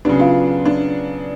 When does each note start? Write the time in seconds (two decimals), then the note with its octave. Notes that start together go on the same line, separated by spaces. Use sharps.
0.05 C#3 F#3 B3 D4
0.20 F4
0.65 D4